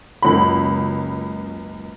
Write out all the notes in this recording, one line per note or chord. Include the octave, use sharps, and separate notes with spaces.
F#1 C#2 B5